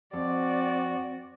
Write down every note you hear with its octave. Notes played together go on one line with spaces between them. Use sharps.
F2 C4 F#4 D5